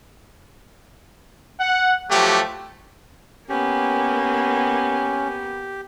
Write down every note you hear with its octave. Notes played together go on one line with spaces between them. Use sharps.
F#5
F3 F#3 A3 G4
A#3 B3 C#4 G4